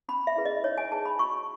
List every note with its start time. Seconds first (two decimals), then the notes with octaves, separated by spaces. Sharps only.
0.09 C#4 B5
0.27 E5
0.36 E4 G#4 B4
0.45 D#5
0.64 D#4 C#5
0.78 G#5
0.92 G#4 B4 A5
1.05 B5
1.19 F#4 C#6